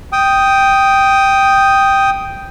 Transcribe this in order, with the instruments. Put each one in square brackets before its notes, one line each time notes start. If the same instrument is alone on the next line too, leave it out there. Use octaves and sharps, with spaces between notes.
[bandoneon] G5 D#6